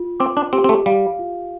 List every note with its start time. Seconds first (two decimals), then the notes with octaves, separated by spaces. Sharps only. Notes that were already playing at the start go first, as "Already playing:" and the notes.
Already playing: F4
0.20 C4 D6
0.37 D4
0.53 C4 G4
0.64 C4
0.69 A3
0.86 G3 F5
1.19 F4